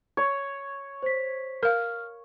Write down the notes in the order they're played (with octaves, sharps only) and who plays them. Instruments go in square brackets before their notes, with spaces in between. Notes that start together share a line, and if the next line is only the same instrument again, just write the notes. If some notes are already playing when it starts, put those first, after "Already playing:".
[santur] C#5
[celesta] C5 B6
[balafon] A#4 F5 [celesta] F6